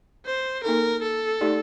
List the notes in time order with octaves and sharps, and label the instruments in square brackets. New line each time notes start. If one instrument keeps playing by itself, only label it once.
[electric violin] C5
[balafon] A#3 D#4 A4 [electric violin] A#4
[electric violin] A4
[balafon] A3 D#4 G4 D5